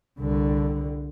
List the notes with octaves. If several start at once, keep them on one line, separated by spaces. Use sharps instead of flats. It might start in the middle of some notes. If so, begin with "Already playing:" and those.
C2 D3